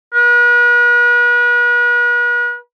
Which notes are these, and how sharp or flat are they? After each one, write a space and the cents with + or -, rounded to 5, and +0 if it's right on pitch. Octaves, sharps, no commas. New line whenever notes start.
B4 -40